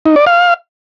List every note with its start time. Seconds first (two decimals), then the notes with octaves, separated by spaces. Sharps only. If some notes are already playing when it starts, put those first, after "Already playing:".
0.06 D#4
0.16 D5
0.26 F5